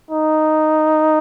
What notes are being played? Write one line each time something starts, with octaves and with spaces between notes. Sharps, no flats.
D#4